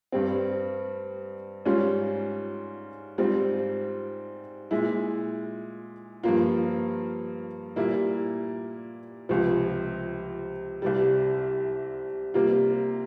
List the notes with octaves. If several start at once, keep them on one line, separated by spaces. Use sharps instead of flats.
G2 G3 C4
G#2 G3 C#4 F4
G#2 G3 C4 F4
A#2 G#3 E4
G2 F3 A#3 F4
A#2 G3 A#3 E4
C#2 C3 F3
C2 C3 G3
C3 G3 A#3 F4